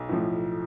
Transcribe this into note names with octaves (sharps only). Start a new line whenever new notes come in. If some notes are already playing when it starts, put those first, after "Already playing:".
Already playing: B1
A2 F3